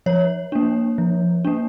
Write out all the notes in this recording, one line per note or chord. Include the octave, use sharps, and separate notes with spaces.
F3 C#5
A#3 D4
F3
A#3 D4